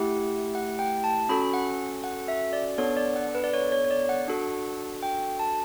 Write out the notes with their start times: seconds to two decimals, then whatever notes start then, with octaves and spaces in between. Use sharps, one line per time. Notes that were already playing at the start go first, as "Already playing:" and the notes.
Already playing: A3 E4 G4 F#5
0.55 F#5
0.79 G5
1.04 A5
1.29 C#4 F#4 A4 B5
1.54 F#5
2.04 F#5
2.28 E5
2.53 D5
2.78 B3 D4 A4 C#5
2.97 D5
3.16 F#5
3.35 B4
3.44 D5
3.54 C#5
3.72 C#5
3.85 C#5
3.91 D5
4.09 F#5
4.28 D4 F#4 A4
5.03 G5
5.39 A5